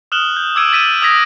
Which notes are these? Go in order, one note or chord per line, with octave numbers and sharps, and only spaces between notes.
D#6 F6 F#6 E7 F#7 G7
G6
D6 E6 G#6 D7 D#7
A6 B6 D#7 E7
D#6 E6 G6 G#6 A#6 B6